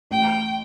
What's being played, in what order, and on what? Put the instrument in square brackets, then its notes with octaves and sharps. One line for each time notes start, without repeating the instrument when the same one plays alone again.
[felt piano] A1 [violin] G5